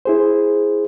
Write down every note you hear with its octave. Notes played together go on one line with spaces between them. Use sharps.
E4 G#4 C5